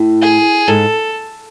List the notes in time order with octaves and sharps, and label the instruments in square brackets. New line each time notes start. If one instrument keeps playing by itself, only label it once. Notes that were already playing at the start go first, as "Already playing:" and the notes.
Already playing: [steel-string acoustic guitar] A2
[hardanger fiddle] G#4
[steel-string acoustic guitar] G#2 [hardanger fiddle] A4